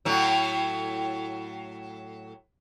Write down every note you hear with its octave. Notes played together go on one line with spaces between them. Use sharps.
A2 F#3